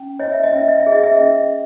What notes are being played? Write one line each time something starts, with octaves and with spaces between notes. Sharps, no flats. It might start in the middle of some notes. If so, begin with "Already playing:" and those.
Already playing: C#4
C#5 D#5
E5
D#5
C#4 E5
D#5
E5
G#4
D#5
E5
C#4 D#5